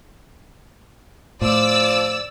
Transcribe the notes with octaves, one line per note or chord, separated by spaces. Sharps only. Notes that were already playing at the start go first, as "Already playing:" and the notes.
A2 F3 D5 E6